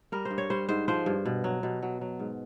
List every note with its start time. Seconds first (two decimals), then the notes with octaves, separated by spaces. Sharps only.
0.12 G3 A#4
0.25 C5
0.31 G2
0.38 C#5
0.50 G3 C5
0.69 G#2 C5
0.88 F3 C5
1.06 G2
1.26 B2
1.44 F#3
1.63 B2
1.82 F#3
2.01 F#3
2.19 G#2